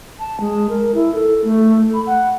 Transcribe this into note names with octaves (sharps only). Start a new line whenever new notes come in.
A5
G#3
A#4
E4
A4
A3
B5
F#5